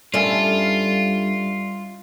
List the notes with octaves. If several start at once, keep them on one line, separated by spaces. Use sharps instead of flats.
G2 G3 C#4 F4 A4 D5 E5